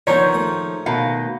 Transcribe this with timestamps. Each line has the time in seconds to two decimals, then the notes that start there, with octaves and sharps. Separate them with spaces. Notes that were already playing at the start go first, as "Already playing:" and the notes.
0.07 D#3 F3 B3 E4 F4 C#5
0.33 A#1 A2 D#6
0.86 B2 D#3 F5